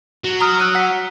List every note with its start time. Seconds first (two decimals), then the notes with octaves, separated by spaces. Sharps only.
0.24 F#3
0.40 A#5 D#6 F6
0.60 E6 F#6 D#7
0.75 F#5 B6